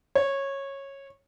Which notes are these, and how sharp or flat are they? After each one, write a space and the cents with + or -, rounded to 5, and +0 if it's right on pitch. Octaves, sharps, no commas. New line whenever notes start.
C#5 -15